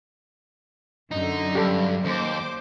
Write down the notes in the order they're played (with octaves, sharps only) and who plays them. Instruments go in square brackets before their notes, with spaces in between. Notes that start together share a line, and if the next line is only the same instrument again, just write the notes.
[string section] F#2 D3 [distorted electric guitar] D#4
[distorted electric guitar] G2 [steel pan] G4 A4
[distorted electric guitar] D#2 [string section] C5 D6